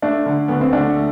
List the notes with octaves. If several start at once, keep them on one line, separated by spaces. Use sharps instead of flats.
A3 D4
D3
D2 B3
C4
D2 D4
A3